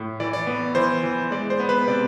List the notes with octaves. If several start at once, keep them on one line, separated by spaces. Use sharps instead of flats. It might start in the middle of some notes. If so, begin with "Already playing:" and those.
Already playing: A2
E3 D5
D5
B3
E3 C5
E3
G#3 D5
C5
B3
B4
C3 D5